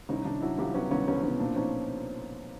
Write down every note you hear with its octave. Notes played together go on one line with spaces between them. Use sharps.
C2 C#4 D#4
C2 D4 E4
F#3 E4 F#4
C2 F4 G4
F#3 B3 C#4
C2 B3 C#4
C2 B3 C#4
B2 B3 C#4
A#2 C4 D4
F3 C#4 D#4